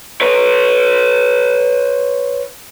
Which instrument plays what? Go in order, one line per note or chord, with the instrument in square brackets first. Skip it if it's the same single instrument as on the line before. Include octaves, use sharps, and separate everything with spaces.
[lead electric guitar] B4 C#5